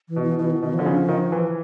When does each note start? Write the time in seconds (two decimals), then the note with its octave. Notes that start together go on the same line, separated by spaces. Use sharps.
0.09 E3
0.16 B2
0.23 E3
0.39 B2 E3
0.51 D#3
0.62 B2 D#3
0.74 F3
0.79 D3
0.86 C#3
1.09 D#3
1.32 E3